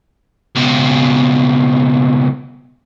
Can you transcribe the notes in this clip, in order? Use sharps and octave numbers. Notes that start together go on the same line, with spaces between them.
C#2 B2